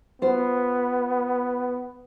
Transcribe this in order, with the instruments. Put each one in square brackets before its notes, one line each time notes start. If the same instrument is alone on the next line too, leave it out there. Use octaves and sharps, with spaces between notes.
[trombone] B3 [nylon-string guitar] F4 C5